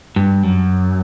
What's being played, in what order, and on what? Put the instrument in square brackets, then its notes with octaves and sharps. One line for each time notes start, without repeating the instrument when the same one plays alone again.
[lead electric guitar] G2
F#2